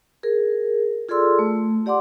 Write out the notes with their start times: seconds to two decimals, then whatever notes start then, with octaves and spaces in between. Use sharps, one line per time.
0.23 G#4 A#4
1.09 F4 G#4 A4 D5 C6 E6
1.39 A3
1.86 G4 D5 F#5 C6 D6